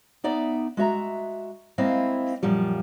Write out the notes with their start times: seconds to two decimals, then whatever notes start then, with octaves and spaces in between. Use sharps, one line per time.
0.24 B3 D#4 D5 E5
0.77 G#3 F#4 E5 A#5
1.78 G#3 A#3 C4 E4 D#5 F5
2.43 F#2 A#2 F3 G3